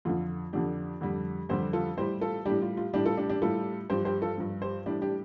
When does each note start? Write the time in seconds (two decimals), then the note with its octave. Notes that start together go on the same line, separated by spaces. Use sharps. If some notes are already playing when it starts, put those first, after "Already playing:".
0.05 F2 D3 F3 F4
0.53 F2 D3 F3 D4 G4
1.01 F2 D3 G3
1.49 F2 D3 G3 G4 C5
1.73 F4 A4
1.97 A2 G3 G4 C5
2.21 F4 A4
2.45 A2 G3 D4 G4
2.62 F4
2.77 F4
2.94 A2 G3 D4 G4
3.06 F4 A4
3.17 D4 G4
3.29 D4 G4
3.42 A2 G3 F4 A4
3.90 G2 F3 G4 C5
4.05 G4 C5
4.22 F4 A4
4.38 G2 F3
4.62 G4 C5
4.86 A2 G3 D4 G4
5.02 D4 G4